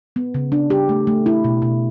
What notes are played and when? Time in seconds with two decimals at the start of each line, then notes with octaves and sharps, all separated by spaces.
0.16 B3
0.34 C#3
0.52 D4
0.70 G4
0.89 A3
1.07 A3
1.26 E4
1.44 B2
1.62 B2